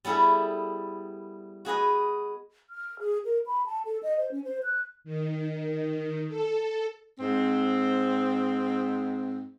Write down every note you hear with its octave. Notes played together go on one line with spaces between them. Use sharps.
G3 B3 E4 G#4 A4
F#4 G#4 B4 D#5
F6
G#4
A#4
B5
A5
A4
D#5
C5
C#4
C5
F#6
D#3
A4
G#2 C4